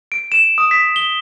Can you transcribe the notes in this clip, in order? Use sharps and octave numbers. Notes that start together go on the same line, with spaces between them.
D7
E7
D#6
B6
G7